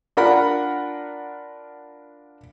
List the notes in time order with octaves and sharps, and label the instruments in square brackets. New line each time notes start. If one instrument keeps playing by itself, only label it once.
[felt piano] D4 F4 A#4 F#5 B5